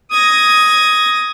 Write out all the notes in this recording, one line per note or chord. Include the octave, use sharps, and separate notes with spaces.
D#6 G#6 A#6